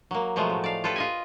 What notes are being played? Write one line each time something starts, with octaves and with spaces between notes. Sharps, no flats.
F#3 A#3
B2 F3 F#3 G#3 A3
A2
D5 F5
F4 G4 A4 B4
F4 D#5 G#5